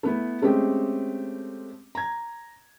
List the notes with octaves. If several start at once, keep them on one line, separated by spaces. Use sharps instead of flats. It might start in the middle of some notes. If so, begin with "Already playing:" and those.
A3 B3 E4
G#3 A3 C4 C#4 G4
A#5 G#6